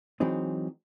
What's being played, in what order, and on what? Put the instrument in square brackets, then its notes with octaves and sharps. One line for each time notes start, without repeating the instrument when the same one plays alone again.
[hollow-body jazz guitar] E3 F#3 G#3 C4 D#4